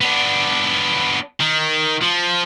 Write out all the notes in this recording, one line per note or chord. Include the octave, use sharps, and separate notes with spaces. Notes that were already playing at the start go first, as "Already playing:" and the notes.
B3 D4
D#3
F3